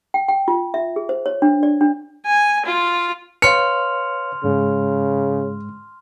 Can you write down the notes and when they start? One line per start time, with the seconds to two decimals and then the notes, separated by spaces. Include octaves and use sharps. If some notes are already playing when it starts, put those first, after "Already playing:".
0.14 G5
0.28 G5
0.48 F4
0.74 E5
0.96 G#4
1.09 C5
1.26 C#5
1.42 D4
1.63 D5
1.81 D4
2.27 G#5
2.66 F4
3.42 B4 C#5 F5 C6 F6 C#7 F7
4.44 G#2 C#3 G#3